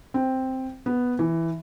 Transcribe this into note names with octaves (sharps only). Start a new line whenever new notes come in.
C4
B3
E3